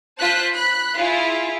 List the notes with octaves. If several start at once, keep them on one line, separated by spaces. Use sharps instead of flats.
F4 C5 A5 F#6 B6
B5 F#6
E4 F4 G#4